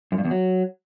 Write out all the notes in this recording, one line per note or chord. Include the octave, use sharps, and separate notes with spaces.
F#2
G2
E2
F#3